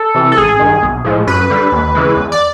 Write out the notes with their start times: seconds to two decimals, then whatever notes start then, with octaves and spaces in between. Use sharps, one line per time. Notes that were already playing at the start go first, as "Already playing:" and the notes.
Already playing: A4
0.14 C3 E3
0.32 A4
0.37 A1 G#4
0.59 G2 D#3
0.83 B1
1.05 A2 F3 G#3
1.27 F#2 B4
1.50 D3 G3
1.72 D#2
1.95 C#3 E3 G#3
2.16 E2
2.32 D5